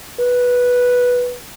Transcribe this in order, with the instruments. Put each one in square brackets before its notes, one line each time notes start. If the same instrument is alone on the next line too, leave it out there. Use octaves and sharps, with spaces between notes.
[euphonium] B4